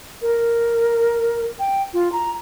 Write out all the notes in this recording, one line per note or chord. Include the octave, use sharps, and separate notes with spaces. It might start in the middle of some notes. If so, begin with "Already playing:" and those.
A#4
G5
F4
A#5